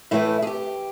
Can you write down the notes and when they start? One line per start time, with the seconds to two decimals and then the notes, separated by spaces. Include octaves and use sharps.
0.11 A2 E3 A3 E4
0.42 G#4
0.47 G4